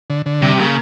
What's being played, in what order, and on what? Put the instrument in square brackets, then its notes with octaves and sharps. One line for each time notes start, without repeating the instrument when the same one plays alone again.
[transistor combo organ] D3
D3
[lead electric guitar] C3 [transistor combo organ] G3
[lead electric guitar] C#3 [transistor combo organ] A#3